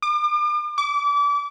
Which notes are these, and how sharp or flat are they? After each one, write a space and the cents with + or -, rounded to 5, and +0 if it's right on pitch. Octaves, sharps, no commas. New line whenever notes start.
D6 +40
D6 -30